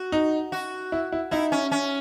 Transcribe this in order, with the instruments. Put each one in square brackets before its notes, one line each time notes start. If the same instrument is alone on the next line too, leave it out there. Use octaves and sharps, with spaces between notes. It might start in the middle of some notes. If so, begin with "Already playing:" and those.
Already playing: [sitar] F#4
[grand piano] D#4
[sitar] F#4
[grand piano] E4
E4
[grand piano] D#4 [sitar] E4
[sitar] C#4
C#4